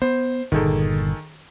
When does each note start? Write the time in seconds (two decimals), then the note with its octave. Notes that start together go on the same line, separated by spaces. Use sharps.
0.02 B3 C5
0.52 G1 A#2 D#3 G#4 A4